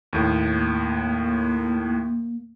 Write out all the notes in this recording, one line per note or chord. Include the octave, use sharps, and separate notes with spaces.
D#2 A2
A#3